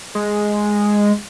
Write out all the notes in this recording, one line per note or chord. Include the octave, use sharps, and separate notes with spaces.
G#3